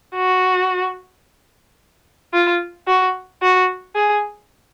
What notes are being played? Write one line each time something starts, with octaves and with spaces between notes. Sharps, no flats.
F#4
F4
F#4
F#4
G#4